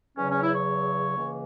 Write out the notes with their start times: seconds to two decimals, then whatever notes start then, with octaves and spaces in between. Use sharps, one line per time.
0.18 E2 C#3 F#3 C#4
0.30 C#4
0.43 E4
0.55 C#5
1.16 C#2 C#3 E3 A#3